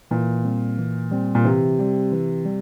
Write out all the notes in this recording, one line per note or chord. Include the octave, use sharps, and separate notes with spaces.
A#2 E3
G3 C4
E3
G3 C4
A#2
C3 E3
G3 C4
E3
G3